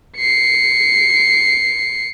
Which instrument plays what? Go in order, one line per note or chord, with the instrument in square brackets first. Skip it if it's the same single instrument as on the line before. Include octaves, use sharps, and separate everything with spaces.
[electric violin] C7 C#7